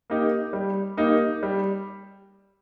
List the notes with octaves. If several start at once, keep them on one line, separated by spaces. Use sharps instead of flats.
A#3 D#4 G4
G3
A#3 D#4 G4
G3